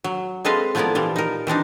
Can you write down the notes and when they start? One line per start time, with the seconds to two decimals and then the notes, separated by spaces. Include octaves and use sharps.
0.04 F#3
0.45 G#3 C4 A4 B4 D#5 F5
0.75 F3 A3 B3 E4 A#4 D5
0.95 A#2 E3 F3 G3
1.16 D#4 A#4
1.47 E3 C4 D4 D#4